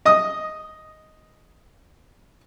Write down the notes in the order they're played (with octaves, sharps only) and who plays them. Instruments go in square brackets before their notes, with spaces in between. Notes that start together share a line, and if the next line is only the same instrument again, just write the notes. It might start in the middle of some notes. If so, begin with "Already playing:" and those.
[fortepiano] D#5 D#6